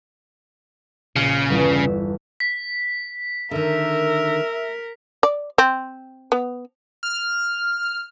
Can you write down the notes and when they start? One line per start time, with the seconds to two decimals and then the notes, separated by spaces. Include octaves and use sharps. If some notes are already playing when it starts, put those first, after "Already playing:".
1.16 A#1 C#3
1.50 G1 E2
1.70 E6 B6
2.40 B6
3.51 D3 D#3 A#4 E5
5.23 D5
5.58 C4
6.32 B3
7.03 F6